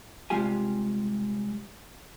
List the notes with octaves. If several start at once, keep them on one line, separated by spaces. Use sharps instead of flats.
C3 G3 G#3 F4 G4 G#5